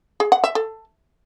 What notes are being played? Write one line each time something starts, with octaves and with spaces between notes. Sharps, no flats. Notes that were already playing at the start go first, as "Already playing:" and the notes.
G#4
F#5
E5
A4